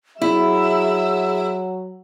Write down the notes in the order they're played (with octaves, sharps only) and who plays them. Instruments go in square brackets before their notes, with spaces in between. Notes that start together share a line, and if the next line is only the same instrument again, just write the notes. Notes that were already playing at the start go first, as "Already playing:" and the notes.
[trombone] F#3 [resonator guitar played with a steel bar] E4 [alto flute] G#4 [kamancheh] E5 E6